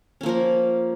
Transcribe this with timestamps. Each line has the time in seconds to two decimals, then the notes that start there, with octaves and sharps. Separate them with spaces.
0.21 C#4
0.23 A#3
0.26 F3
0.29 A#4